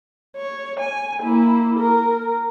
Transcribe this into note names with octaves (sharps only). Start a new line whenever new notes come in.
C#5
G#5
A#3 E4
A#4